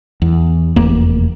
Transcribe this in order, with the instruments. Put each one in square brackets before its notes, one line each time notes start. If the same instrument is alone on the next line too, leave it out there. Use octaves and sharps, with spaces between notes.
[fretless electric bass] E2
F1 E2 A#3